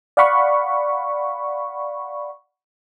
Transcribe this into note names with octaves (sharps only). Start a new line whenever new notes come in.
D5 F5 F#5 B5 C#6